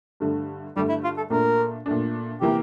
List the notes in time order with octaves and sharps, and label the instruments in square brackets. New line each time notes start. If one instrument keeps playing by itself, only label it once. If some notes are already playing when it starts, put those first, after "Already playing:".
[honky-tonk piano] G2 D3 A3
[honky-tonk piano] G2 D3 A3 [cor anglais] G3
[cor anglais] E4
F4
A4
[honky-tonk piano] A#2 A3 D4 [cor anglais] A#4
[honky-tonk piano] A#2 A3 D4
[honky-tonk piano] C3 E3 A#3 E4 A#4 [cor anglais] G4